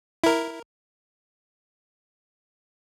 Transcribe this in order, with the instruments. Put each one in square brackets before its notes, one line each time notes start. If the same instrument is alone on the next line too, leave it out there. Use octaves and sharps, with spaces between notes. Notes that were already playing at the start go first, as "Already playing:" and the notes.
[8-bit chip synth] E4 A#4